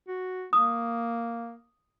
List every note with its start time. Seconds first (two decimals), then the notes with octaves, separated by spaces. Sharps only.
0.08 F#4
0.53 A#3 D#6